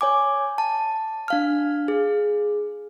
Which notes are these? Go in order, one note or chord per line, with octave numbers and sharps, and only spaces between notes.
C#5 G#5 D6
A5
D4 F5 F6
G#4